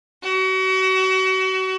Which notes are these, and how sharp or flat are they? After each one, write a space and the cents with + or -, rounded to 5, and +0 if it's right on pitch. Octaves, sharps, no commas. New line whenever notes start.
F#4 +35